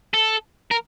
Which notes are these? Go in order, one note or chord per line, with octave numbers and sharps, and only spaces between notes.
A4
A#4